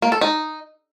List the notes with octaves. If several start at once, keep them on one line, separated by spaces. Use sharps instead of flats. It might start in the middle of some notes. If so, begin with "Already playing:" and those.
A#3
A4
D#4